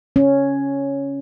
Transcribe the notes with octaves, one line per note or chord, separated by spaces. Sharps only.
C#4